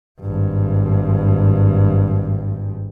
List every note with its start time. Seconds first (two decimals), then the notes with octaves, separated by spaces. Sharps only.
0.21 G#1 G2